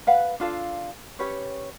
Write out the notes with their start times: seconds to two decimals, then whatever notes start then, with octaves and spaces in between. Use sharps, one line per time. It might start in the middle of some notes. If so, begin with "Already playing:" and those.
0.07 B4 F5 F#5
0.40 D4 F4 A4 F5
1.19 C#4 G4 B4 C#5